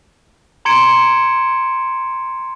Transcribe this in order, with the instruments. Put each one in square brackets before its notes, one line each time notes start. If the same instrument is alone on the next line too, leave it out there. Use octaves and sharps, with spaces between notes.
[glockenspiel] A#5 C6 G#6 C#7 D7 E7